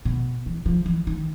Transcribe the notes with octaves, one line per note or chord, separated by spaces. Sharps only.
B2
E3
F3
E3
D#3